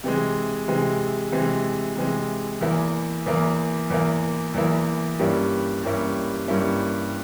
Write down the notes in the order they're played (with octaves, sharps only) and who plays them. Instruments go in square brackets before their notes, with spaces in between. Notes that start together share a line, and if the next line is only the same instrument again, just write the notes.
[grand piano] C3 E3 G#3
C3 E3 G#3
C3 E3 G#3
C3 E3 G#3
E2 E3 A#3 E4
E2 E3 A#3 E4
E2 E3 A#3 E4
E2 E3 A#3 E4
G2 G3 A#3 C#4 E4
G2 G3 A#3 C#4 E4
G2 G3 A#3 C#4 E4